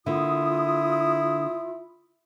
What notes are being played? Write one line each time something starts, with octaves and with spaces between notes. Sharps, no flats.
D3 A#3 E4 F4 D#6